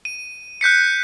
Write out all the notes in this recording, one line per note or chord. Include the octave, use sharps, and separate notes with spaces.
D#7
F#6 G6 B6 C#7